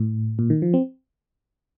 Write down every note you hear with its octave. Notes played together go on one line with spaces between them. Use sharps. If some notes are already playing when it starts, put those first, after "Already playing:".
Already playing: A2
A#2
D#3
F3
C4